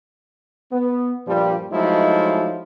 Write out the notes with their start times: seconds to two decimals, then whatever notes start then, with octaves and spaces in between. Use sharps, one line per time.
0.71 B3
1.27 G2 A#2 F3 G3
1.71 F3 F#3 G#3 A3 D#4 E4